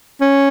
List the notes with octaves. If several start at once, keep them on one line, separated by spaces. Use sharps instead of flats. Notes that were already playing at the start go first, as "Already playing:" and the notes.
C#4